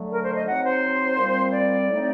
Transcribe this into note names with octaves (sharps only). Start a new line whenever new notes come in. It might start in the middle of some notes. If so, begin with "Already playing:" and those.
Already playing: D3 F#3 A3
A#4
C5
D#5
F#3 C4 D#4 F#5
C5
A#2 G3 C4
D5
A2 A3 C4 D#4